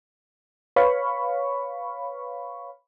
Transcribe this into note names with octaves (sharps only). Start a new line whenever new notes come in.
B4 C#5 F5 B5 C#6